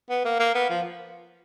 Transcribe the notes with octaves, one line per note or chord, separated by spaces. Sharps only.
B3
A#3
A#3
B3
F3